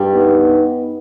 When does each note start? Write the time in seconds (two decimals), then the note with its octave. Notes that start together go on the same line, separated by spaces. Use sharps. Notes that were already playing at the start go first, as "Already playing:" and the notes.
Already playing: G2 G3
0.12 B3 D#4